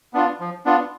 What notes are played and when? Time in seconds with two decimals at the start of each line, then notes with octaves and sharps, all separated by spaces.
0.14 B3 D4 F4
0.40 F3
0.65 B3 D4 F4